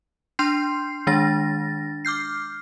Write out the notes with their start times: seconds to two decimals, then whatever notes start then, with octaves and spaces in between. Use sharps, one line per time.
0.39 D4 C6 G6 C7
1.07 D#3 G#3 D4 A6 A#6
2.05 D6 F6 G6 C7